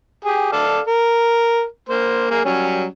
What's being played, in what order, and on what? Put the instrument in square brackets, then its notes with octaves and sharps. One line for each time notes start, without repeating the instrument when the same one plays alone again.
[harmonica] G4 G#4
A4 D5 F5
A#4
A#3 C5 C6
A#3 G#4
F#3 G3 C#4